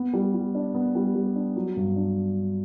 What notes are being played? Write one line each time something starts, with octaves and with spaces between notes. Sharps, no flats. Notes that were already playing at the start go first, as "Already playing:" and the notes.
Already playing: B3
G3
G3
D4
B3
G3
G3
D4
F#3
G2
D4